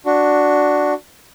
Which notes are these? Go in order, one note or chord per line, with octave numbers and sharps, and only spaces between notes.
D4 F#4